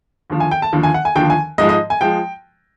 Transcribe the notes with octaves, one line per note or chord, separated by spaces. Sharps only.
D#2 D3 F3
G#5
G5
A5
D#2 D3 F3
G#5
F#5
G#5
D#2 D3 F3 G5
G#5
G#2 F3 G#3 D#5
D#5
G#5
F3 G#3 G5